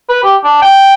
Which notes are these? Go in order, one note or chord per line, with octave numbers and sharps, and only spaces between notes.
B4
G4
D4
G5